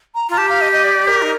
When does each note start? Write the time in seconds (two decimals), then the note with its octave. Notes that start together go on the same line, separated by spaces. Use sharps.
0.15 A#5
0.29 F4 A#5
0.37 G4 A5
0.49 F5
0.61 D#5
0.72 D#5
0.84 D5
1.08 A#4
1.22 D#4